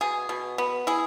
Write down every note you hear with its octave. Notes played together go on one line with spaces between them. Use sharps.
B2 G#4
B2
B3
E4 G#4